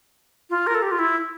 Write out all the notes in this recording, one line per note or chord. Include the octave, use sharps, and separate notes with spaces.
F4
A#4
A4
G4
F4
E4